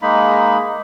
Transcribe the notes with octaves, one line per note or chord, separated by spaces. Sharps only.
G#3 A#3 D#4 B5